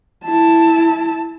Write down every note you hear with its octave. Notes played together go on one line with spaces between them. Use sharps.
E4 A5